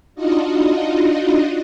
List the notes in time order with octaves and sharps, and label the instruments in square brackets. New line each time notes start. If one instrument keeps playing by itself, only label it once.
[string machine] D4 D#4 F4 F#4 D#5